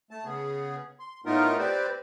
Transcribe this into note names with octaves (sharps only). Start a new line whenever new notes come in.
A3 A5
C#3 B3 G#4
C6
A2 A3 B3 D#4 F4 A#4
C4 G4 B4 C5 D5